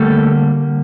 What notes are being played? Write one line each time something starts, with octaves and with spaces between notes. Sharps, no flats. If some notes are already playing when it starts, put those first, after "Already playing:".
Already playing: D3 G3 A3 A#3 A4